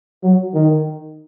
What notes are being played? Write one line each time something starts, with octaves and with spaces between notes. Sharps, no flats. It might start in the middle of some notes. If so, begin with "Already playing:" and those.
F#3
D#3